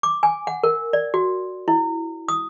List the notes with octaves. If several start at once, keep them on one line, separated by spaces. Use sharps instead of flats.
D6
G#5
F#5
A#4
D5
F#4
E4
D#6